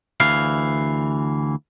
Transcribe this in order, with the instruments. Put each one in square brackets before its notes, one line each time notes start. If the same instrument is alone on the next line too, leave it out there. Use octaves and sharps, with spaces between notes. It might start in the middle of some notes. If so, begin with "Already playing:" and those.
[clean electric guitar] D2 E3 F5